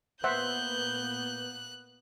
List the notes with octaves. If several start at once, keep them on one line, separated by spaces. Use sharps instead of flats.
A#2 A#3 B3 C5 E5 F#5 F#6 G6